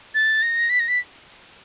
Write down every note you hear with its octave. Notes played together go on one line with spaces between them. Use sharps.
A6
A#6
B6
A#6
B6